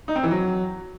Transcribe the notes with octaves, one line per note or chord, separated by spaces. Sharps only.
D#4
C4
E3
F#3